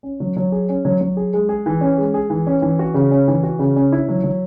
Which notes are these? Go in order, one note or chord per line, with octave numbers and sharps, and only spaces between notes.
C#4
F#3
F#3
G#4
C#4
F#3
F#3
G#4
G#3
G#4
E3
C#4
G#3
G#4
E3
C#4
E3
F#4
C#3
C#4
E3
F#4
C#3
C#4
E4
F#3
F#3